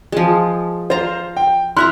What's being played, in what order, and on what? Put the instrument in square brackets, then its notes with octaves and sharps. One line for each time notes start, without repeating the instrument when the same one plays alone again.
[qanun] F3 G#3
[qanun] F4 A#5 [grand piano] C5
[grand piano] G5
[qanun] E4 E5 A#5 [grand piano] C6 F6 F#6